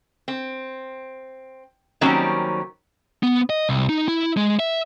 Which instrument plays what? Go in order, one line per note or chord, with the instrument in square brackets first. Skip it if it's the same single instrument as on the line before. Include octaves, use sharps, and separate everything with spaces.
[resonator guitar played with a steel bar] C4
D#3 F#3 G3 A#3 C4 C#4
[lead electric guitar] B3
D#5
C2
D#4
E4
G#3
E5